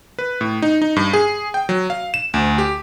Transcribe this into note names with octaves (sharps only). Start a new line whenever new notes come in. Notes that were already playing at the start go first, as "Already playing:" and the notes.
B4
A2
D#4
D#4
G2
G#4
G5
F#3
F5
E7
D2
G4